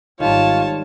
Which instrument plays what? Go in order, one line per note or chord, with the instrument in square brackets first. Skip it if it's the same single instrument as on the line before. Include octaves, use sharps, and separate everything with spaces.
[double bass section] G#1 [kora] D#3 G3 [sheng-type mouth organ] F4 [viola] C#5 A5